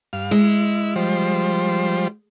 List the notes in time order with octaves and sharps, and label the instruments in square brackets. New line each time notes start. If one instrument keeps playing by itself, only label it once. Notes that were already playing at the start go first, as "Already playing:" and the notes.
[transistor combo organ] G2 F5
[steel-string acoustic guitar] G#3 [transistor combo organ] E4
[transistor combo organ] F3 G3 C5